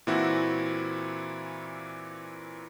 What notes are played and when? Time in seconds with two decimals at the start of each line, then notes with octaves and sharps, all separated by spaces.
0.07 A#2 E3 C4 E4 F#4